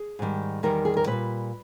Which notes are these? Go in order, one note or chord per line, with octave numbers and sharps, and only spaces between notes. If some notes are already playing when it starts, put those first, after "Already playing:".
Already playing: G#4
G#2 D#3 G3
E2 D#3 G3 A#4
G#4
A#4
A#2 G3 B4